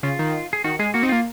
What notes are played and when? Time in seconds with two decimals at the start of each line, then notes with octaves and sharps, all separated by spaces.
0.03 C#3 F4
0.19 D#3
0.53 G#4
0.64 D#3 F#4
0.79 G#3 G#4
0.94 A#3 F#4
1.03 C4 D#4
1.09 A#3 F4